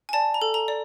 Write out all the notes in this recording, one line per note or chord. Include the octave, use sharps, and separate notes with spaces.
G#5
D5 A5
A#5
A4
A#5
D5